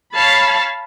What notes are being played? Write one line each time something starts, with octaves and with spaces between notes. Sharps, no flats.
C#5 F5 A5 B5